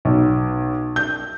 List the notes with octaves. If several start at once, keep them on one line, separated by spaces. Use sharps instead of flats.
B1
G6